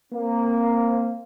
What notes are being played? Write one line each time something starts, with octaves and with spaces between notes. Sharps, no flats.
A#3 C4